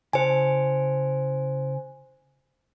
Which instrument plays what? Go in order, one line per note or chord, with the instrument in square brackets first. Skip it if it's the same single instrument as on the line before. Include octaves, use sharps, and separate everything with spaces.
[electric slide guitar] C#3 E4 A5 [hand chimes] C5 G#5